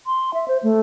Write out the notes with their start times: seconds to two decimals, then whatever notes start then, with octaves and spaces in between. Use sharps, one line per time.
0.06 C6
0.34 E5
0.48 C5
0.63 A3